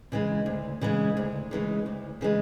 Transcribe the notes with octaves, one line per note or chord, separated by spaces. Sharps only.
C#3 E3 G#3
D2
C#3 E3 G#3
D2
C#3 E3 G#3
D2
C#3 E3 G#3